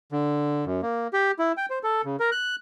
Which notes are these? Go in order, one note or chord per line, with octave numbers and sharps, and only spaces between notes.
D3
F#2
A#3
G4
E4
G5
C5
A4
C#3
A#4
F#6